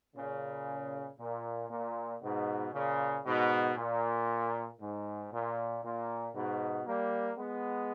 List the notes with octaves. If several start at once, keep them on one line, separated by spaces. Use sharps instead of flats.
A#2 C#3
A#2
A#2
G#2 B2
A#2 C#3
G#2 B2
A#2
G#2
A#2
A#2
G#2 B2
G3 A#3
G#3 B3